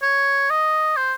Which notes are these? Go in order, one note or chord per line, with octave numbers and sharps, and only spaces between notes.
C#5
D#5
C5